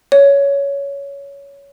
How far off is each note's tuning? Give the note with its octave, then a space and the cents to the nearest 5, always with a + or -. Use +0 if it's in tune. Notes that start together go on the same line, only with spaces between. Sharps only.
C#5 +15